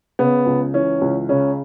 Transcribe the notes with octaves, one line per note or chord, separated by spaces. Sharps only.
C#3 B3
C#2
E3 C#4
C#2
C#3 C#4